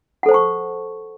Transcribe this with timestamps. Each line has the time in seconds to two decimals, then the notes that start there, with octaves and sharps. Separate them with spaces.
0.23 F#5
0.26 A4
0.29 C5
0.31 A5
0.34 C#6